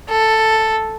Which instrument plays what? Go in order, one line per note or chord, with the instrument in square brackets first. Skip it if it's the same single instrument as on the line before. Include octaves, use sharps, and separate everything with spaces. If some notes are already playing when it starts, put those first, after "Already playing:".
[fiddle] A4